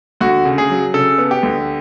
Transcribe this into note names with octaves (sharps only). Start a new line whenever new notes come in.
D2 F#4
C#3
G#4
F#3
C#3 A4
B3
G4
D2